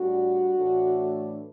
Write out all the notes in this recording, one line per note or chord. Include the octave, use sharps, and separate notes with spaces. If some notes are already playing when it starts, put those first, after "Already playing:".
Already playing: A2 G3 D4 F#4
A2 E3 A3 D4